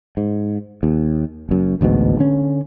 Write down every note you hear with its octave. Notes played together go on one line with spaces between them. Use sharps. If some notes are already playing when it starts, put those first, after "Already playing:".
G#2
D#2
F#1 F#2
A1 D2 G#2 B2
D3 C#4